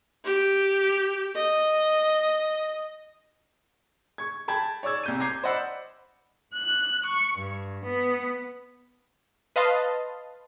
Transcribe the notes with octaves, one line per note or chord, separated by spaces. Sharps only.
G4
D#5
C#6 G#6
G5 A5 B5 G#6
C#5 D5 C#6 E6 G#6
C2 G6 D#7
A#5 D6 G6 G#6 C7
C5 D5 D#5 F#5 B5 E6
F#6
C#6
G2
B3
B4 D#5 F5 A5 C6